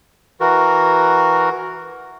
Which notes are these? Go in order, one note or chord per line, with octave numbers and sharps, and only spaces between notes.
E3 F#4 A#4